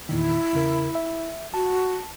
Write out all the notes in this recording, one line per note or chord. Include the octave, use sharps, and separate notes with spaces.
E2 A#2 D#3 E4
E2 C#3 A#4
E5
F#4 A5